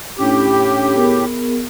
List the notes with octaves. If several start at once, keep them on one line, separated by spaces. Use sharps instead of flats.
A2 C#4 D4 G4
B3 G#4 A#4